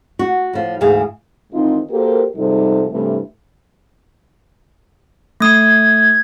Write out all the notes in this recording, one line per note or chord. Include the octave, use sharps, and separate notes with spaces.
F#4
A2 F3
D2 G#2 E3 G#4 F5
G#2 D#3 E3 C4 D#4 F4
A#3 F#4 G4 A4 A#4 C5
G#2 C3 F3 G3 D#4 A4
G2 C3 E3 A3
A3 D#6 G#6